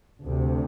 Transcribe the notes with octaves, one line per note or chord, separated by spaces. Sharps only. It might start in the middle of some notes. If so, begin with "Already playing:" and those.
D2 C3